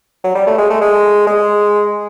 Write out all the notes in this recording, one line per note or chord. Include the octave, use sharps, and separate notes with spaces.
F#3
G3
A3
G#3
A3
G#3
G#3